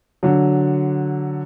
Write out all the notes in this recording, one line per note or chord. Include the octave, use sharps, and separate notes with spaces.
D3 F#3